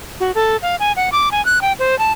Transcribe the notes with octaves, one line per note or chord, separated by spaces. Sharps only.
F#4
A4
F5
G#5
F#5
D6
G#5
F#6
G5
C5
A5